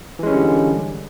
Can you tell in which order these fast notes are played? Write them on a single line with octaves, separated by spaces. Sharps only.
E3 G#3 C#4 G3 D3